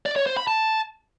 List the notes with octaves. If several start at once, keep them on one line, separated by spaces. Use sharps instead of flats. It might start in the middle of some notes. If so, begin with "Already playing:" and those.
D5
C#5
C5
B5
A5